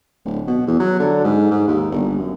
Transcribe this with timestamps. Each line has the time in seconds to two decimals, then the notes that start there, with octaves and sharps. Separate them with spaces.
0.25 D1
0.47 B2
0.67 E2
0.80 F#3
0.99 D3
1.24 G#2
1.51 G#2
1.68 D#2
1.92 G1
2.18 F#2